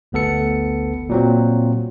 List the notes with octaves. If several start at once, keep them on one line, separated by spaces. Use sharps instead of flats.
G1 D2 B3 A4 C#7
A#2 F#3 C4